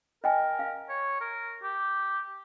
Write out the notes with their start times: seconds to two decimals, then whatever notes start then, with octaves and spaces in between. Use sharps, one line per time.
0.24 A#4 D#5 G5 G#5
0.59 F5
0.89 C#5
1.21 A#4
1.63 G4